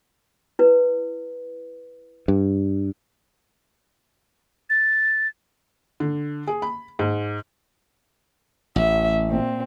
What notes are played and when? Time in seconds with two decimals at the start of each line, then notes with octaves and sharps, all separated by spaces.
0.59 E4 B4
2.28 G2
4.70 A6
6.00 D3
6.47 G#4
6.62 B5
6.99 G#2
8.76 A1 E5
9.28 A#2 C4